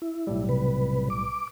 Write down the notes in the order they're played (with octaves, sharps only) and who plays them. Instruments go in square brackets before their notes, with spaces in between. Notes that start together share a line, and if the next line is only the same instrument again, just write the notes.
[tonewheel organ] E4
[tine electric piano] B1 A2 G3
[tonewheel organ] C3 B4
D6